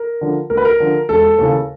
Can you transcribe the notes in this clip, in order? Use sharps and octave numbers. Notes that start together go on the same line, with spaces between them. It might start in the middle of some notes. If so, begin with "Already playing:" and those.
Already playing: A#4
D3 F3
D2 A#4
B4
A#4
D3 F3
E1 A4
D#2 C#3 E3